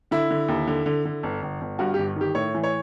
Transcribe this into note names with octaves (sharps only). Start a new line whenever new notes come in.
D3 E4
D3
D#2
D3
D3
D3
G1
G1
G1
G2 F#4
G1 G4
D#3 G4
A2 C#5
E3
C#5